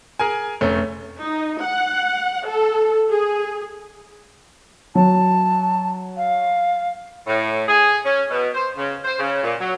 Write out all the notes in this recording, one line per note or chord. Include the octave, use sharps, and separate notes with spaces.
G#4 A#4 G#5
F1 A3 C#4
D#4
F#5
A4
G#4
F#3 A5
F5
A2
G#4
C#4
B2
C5
C#3
C5
C#3
A#2
F#3